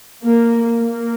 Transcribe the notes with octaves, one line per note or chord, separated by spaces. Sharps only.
A#3
A#3